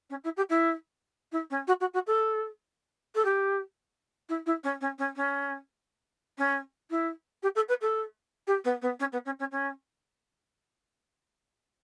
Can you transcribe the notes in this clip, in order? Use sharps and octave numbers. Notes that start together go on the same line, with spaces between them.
C#4
E4
G4
E4
E4
C#4
F#4
F#4
F#4
A4
A4
G4
E4
E4
C#4
C#4
C#4
C#4
C#4
E4
G4
A4
B4
A4
G4
B3
B3
C#4
B3
C#4
C#4
C#4